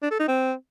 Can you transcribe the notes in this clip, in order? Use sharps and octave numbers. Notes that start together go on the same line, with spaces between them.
D4
A4
D#4
C4